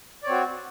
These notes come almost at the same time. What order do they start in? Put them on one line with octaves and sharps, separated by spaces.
D5 C#5 C4 F#4